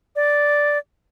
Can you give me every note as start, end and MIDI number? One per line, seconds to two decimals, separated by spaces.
0.16 0.78 74